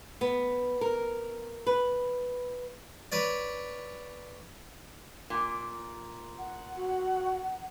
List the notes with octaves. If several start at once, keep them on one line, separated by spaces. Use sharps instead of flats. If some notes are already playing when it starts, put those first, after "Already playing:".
B3
A#4
B4
B4 C#5 D5
A#2
F#5
F#4